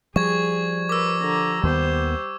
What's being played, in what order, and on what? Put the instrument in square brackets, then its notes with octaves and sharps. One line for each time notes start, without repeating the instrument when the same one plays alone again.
[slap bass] F3 G3 [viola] G#4 [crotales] C#6 G#6
[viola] A#4 B4 [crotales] D6 E6
[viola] D3 A#5
[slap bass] D#2 D#3 B3 [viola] G3 C5